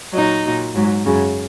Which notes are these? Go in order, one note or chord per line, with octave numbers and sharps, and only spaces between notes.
A#2 F#3 D#4
A#2 F#3
G#2 F#3
F#2 C#3 F#3